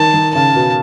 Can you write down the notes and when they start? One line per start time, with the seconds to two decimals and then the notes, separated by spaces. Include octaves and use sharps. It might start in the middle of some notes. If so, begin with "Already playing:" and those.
Already playing: D#3 A5
0.14 D#3
0.35 C#3 A5
0.56 B2